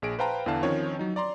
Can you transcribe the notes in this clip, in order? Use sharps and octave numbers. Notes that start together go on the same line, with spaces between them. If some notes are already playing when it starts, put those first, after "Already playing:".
A#1 G#4 D7
B4 C5 F5 G5 A5 A#5
E2 D3 E3 F5 A5
D#3 F3 C4 C#4 C#5
F#3 D#4
D5 A#5 C6